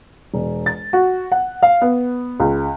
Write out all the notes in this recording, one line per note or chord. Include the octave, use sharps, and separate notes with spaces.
E1
A6
F#4
F#5
F5
B3
C#2